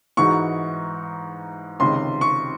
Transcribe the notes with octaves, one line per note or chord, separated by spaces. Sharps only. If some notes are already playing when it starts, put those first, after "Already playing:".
G#2 E3 G#3 D#4 F#4 C#6
C#2 C3 D#3 G#3 C6
C#6